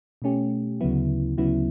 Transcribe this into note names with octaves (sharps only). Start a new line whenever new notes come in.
B2 A3 C#4 G4
D2 C#3 F#3 B3 E4
D2 C#3 F#3 B3 E4